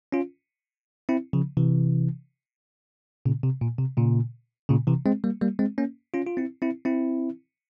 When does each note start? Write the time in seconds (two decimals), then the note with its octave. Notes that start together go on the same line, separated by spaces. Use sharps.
0.12 C#4 F4
1.09 C4 E4
1.33 C#3 F3
1.57 C3 E3
3.25 A#2 C#3
3.43 C3
3.62 A#2
3.79 C3
3.97 A#2 C#3
4.69 A#2 C#3
4.87 C3 E3
5.06 G#3 C4
5.24 G3 A#3
5.41 G3 A#3
5.59 G#3 C4
5.78 A#3 C#4
6.14 C#4 F4
6.26 F4
6.37 C4 E4
6.62 C4 E4
6.85 C4 E4